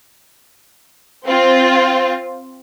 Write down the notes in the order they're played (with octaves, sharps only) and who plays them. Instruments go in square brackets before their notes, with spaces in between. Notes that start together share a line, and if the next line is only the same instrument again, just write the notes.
[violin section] C4 F4